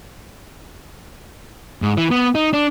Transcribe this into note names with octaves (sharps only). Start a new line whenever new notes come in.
G#2
E3
B3
D#4
D4